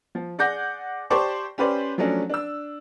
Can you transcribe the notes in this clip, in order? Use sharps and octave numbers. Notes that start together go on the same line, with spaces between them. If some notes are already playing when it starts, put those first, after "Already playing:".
F3
G#4 D5 F#5 D6 G6 A#6
G4 C5 D5 A5 C#6 D6
C#4 G4 B4 C5 D5
F3 F#3 A3 C#4 D4
D4 E6